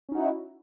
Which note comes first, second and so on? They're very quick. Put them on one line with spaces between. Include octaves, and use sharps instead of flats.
C#4 D#4 F#4 E4